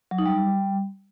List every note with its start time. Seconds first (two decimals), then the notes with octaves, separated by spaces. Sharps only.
0.11 F#3
0.18 D#4
0.26 G3